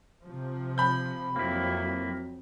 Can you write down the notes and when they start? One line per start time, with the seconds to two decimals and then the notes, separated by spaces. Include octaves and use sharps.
0.24 C3 F3
0.78 B5 G6
1.36 F2 F#3 A#3 C4 E4